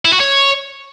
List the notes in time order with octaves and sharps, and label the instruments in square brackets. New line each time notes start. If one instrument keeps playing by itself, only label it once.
[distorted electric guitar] E4
F#4
C#5